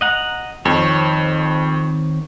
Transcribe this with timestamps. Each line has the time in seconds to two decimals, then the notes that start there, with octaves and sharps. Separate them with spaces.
0.01 D#5 F#5 A#5
0.65 F2 D#3 C4 C#5